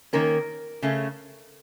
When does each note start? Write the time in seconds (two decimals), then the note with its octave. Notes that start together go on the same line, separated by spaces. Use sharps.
0.13 D#3 A#3 C#4 A#4
0.82 C#3 A3 C#4